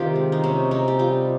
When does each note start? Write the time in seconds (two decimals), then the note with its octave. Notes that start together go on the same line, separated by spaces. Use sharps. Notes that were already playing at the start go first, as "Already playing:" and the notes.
Already playing: C3 D#3 D#4 F4 G4
0.16 G#3
0.32 D#4
0.44 C3 C#4
0.71 C3 D#4
0.88 G4
0.99 G3 F4